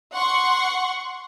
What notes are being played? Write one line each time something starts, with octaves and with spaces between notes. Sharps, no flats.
F#5 C6 C#6